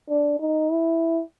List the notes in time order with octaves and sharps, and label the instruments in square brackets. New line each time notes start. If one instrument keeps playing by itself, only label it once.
[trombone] D4
D#4
E4